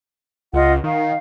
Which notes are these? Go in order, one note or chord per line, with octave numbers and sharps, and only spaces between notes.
C#2 F4 D#5 F#5
D#3 F5